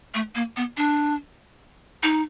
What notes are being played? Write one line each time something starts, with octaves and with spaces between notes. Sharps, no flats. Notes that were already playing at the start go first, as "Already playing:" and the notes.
A3
A#3
B3
D4
D#4